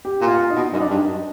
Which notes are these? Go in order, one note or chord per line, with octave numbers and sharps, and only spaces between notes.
G4
A#2
F4
D#4
B2
F#2 D#4
D4
G2 D#4
F#2